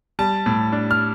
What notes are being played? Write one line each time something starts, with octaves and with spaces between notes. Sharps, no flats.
G3 A5
A2
D4
F6